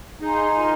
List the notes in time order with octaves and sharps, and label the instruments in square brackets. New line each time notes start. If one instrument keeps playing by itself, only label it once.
[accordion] D#4 [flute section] G#4 F5 G#5 C6
[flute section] F4 A#4 G#5 C6